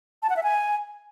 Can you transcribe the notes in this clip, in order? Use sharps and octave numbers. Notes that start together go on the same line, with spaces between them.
A5
F#5
E5
G#5